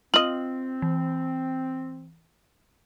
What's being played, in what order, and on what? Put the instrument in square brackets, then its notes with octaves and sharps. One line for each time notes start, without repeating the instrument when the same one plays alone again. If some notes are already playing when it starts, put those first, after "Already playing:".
[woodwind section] C4 [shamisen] F4 D#5 [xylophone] F#7
[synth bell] E3